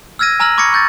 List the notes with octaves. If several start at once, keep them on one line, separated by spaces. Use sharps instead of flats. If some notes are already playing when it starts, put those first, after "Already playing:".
E6 F6 G#6 A#6 D#7
G#5 A#5 E6 F6 A#6 F#7
B5 C#6 D6 G#6 A#6 C#7
C#6 G6 A6